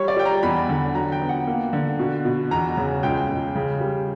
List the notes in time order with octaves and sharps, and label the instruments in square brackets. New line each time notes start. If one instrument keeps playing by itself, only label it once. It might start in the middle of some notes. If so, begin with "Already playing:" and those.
Already playing: [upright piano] G3 C#5
D5
G3 G5
A#5
E2 B5
D3
F#3 A#5
G5
B3
F#5
A#3
D3
B2
B2
E2 A#5
C#3
C#2 G5
C#2
C#3
G3